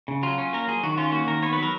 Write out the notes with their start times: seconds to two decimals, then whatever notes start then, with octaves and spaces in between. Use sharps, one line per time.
0.08 C#3
0.23 F#3 F4
0.38 C#4
0.53 A#3 A#4
0.67 F#3 G#4
0.83 D#3 F#4
0.97 C#4 F4
1.12 A#3 F#4
1.27 D#3 A#4
1.42 B3 C#5
1.53 F#3 B4
1.63 A#4